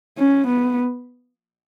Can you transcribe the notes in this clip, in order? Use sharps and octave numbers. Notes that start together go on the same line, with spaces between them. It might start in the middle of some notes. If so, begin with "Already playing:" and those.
C#4
B3